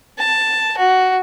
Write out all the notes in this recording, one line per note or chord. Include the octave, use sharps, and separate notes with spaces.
A5
F#4